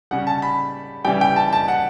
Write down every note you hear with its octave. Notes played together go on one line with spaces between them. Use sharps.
C#3 G3 F#5
A5
B5
C#3 E3 G3 G5
G5
A5
A5
F#5